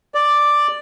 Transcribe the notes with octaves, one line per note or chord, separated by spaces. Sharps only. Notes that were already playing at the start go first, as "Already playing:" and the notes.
D5